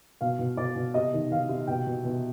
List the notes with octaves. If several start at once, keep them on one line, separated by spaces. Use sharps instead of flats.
B2 F5
B2
B2 D5
B2
C3 D#5
D#3
D#3 F5
C3
B2 G5
B2
B2